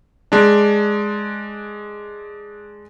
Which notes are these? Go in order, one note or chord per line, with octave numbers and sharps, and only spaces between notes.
G#3 D4